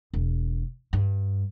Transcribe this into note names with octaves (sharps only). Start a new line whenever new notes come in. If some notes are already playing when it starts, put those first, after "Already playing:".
E1
G2